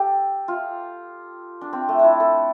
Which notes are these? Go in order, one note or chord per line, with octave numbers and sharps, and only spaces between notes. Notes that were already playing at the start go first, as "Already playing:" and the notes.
Already playing: G4 A4
F4
D4
C4
A3
D4 E4
A4